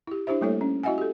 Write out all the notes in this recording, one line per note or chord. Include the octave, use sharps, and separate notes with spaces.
E4 G4
D4 E4 G4 C5 E5
G3 A3 A#3 E4 A4 C#5
C#4
E4 F#4 D#5 E5 F#5 G#5
G4 A4